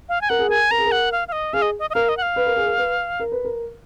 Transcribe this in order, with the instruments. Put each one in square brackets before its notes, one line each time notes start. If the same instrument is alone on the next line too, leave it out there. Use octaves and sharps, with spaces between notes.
[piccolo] F5
G#5
[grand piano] A#4 [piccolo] F#5
[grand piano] G#4
[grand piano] A#4 [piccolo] G#5
[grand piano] A#4 [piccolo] A#5
[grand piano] G#4
A#4
[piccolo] F#5
F5
F5
D#5
[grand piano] G#4 [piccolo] F5
[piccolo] D#5
D#5
D#5
[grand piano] A#4 [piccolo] F5
[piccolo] D#5
F#5
F5
[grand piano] B4
A#4
G#4
A#4
B4
A#4
B4
A#4